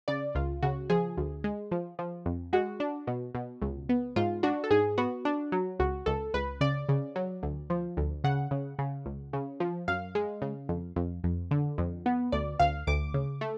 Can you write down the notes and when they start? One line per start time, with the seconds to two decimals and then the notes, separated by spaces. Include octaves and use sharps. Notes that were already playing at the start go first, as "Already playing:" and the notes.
0.08 C#3 D5
0.35 C#2 F4
0.62 C#3 F#4
0.90 F3 G#4
1.17 D2
1.44 G#3
1.71 F3
1.99 F3
2.26 F2
2.53 G#3 F#4
2.80 D4
3.07 B2
3.35 B2
3.62 C#2
3.89 B3
4.16 G#2 F4
4.43 D4 F#4
4.64 A4
4.71 G#2 G#4
4.98 B3 F#4
5.25 D4
5.52 F#3
5.79 C#2 F#4
6.06 C#2 A4
6.34 C#2 B4
6.61 C#3 D5
6.89 C#3
7.16 F#3
7.43 D2
7.70 F3
7.97 D2
8.24 C#3 F#5
8.51 C#3
8.79 C#3
9.06 C#2
9.33 C#3
9.60 F3
9.88 F#2 F5
10.15 G#3
10.42 C#3
10.69 F2
10.96 F2
11.24 F2
11.51 D3
11.78 F2
12.06 B3
12.32 D2 D5
12.59 D2 F5
12.87 D2 D6
13.14 C#3
13.41 A3